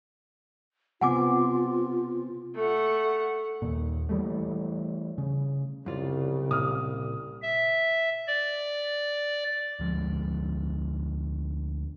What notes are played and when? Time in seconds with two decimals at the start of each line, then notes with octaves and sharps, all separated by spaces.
1.01 C3 B3 C4 F4 F#5 G#5 D6
2.56 A3 F#5
3.62 D#2 A#2
4.09 E3 G3 A3
5.18 C#3
5.86 C2 F#2 C#3 F4 D5
6.51 A#2 D#6 F6
7.42 E5
8.27 D5
9.80 D2 F3 G#3